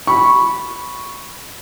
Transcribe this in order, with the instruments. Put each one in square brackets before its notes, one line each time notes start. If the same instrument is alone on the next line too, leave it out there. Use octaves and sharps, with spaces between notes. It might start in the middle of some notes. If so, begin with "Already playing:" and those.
[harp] B5 [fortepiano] C#6